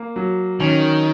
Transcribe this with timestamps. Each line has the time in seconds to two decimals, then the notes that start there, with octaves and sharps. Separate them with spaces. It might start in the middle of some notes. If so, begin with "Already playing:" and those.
Already playing: A#3
0.16 F#3
0.60 D#3 C#4